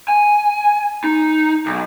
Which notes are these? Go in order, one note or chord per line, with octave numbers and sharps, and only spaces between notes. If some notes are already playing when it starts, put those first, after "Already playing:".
G#5
D#4
B1